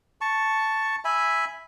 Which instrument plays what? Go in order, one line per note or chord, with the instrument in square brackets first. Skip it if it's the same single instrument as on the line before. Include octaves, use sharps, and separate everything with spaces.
[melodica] A5 C#6
E5 G#5 B5